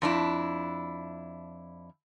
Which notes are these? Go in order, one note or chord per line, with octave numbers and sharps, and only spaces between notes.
F2 D4 E4